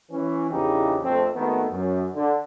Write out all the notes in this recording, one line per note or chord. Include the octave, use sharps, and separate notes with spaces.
E3 C#4
A#1 E2 C#3 E3 D#4 G4
A#1 F2 A3 C4
G#1 D#3 A3 B3
F#2
D3